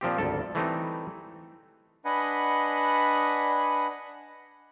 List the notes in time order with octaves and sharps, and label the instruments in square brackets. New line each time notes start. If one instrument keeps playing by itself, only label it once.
[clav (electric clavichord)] A#2 F3 C4 G4
G#1 D2 A4
E3 G3 A3 C4 D#4
[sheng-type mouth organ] D4 B4 D#5 F#5 G#5 B5